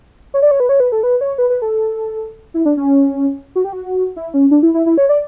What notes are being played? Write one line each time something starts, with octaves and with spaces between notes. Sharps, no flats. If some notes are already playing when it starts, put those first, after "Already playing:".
C#5
D5
C#5
B4
C#5
B4
A4
B4
C#5
B4
B4
A4
E4
D4
C#4
F#4
G4
F#4
E4
C#4
D4
E4
E4
E4
C#5
D5